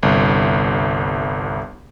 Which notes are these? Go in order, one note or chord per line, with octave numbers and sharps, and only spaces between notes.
G1 C2